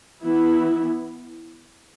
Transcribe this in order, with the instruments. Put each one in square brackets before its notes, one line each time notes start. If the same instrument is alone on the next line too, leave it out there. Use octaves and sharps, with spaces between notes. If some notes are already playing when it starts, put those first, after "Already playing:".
[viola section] E3 B3 E4